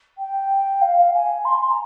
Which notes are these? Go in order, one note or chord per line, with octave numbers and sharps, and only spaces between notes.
G5
F5
F5
G#5
C6
A#5